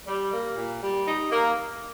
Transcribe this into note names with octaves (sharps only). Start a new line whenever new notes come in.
G3
A#3
A#2
G3
D#4
A#3